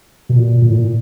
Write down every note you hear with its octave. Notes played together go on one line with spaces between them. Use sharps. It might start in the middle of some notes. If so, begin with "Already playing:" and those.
B2
A#2
A#2
A2
A#2